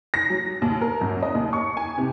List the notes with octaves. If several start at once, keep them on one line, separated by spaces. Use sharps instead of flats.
A#6
F#3
D#2
A#4
F#2
D#5
D#2
C#6
G#5
C3